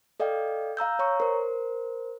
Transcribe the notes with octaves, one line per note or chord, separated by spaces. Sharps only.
A4 D5 D#5 F5 G5
F5 A#5 E6 G6
C#5 A#5 C#6
A#4 C5